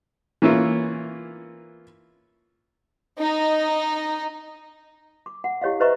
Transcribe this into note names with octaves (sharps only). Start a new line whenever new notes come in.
E3 A#3 C#4 E4 F4
D#4
D6
F#5
E4 G4 C#5 D#5 F5
B4 C5 D#5 E5 A#5 C#6